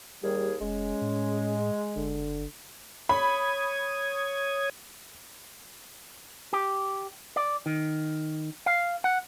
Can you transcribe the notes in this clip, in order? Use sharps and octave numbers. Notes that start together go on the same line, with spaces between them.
D#2 G3 G#4
F1 G#3 C#4
A2
F#1 D3
C#5 B5 D#6 G#6
G4
D5
D#3
F5
F#5